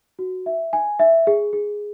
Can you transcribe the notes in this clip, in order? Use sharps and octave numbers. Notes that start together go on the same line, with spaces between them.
F#4
E5
G#5
E5
G#4
G#4